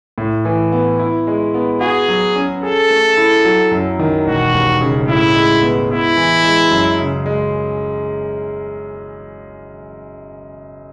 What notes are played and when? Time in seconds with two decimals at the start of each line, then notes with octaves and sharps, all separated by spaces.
0.18 A2
0.45 E3
0.72 B3
0.99 E4
1.27 G#3
1.54 B3
1.81 F#4 G#4
2.09 F#3
2.36 C#4
2.63 G#4 A4
2.90 A3
3.17 E4
3.45 F#3
3.72 F#2
3.99 D#3
4.26 E1 F#4
4.54 D#2
4.81 C#3
5.08 A2 E4
5.35 G#3
5.62 B3
5.90 B3 E4
6.17 E3
6.44 G#3
6.71 F#2
6.98 C#3
7.26 G#3